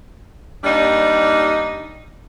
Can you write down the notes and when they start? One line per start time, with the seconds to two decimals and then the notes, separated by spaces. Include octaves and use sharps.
0.64 D#2 G3 D4 D#4